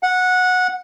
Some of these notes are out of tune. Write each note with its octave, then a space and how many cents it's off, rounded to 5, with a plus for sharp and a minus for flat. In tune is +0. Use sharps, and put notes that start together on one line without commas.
F#5 -15